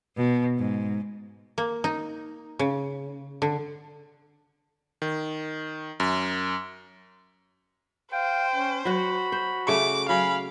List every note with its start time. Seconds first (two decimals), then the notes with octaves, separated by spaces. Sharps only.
0.16 B2
0.58 G#2
1.58 A#3
1.84 D#4
2.59 C#3
3.42 D3
5.02 D#3
6.00 F#2
8.13 C5 F5 G5
8.55 C#4
8.85 F#3 F#4 F#5 B5
9.32 C5
9.68 C#3 A3 D6
10.09 F#3 F5 G#5 B5